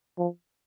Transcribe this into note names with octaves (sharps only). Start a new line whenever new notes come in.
F3